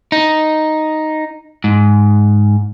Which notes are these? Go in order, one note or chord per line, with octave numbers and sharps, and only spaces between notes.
D#4
G#2